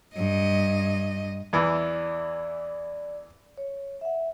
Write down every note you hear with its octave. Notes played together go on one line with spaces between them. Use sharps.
G2 D#5
E2 E3 D5
C#5
E5 F#5